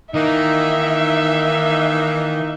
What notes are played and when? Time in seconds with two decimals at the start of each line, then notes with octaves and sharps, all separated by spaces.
0.14 D#3 E3 A#3 D#4 E5